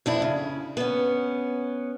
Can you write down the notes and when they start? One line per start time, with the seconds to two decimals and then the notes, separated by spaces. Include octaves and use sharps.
0.06 F2 D4 E4
0.22 C#3
0.77 B3 C#4